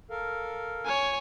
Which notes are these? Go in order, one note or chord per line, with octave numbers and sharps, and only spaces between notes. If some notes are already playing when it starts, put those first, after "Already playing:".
A4 A#4 F5
C#5 G#5